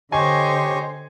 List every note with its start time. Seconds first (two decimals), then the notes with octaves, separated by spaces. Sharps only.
0.12 D3 G4 C5 C#5 D#5 G#5 C#6